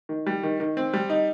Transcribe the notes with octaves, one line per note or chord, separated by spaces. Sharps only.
D#3
G3
D#3
D#3
C4
G3
D#4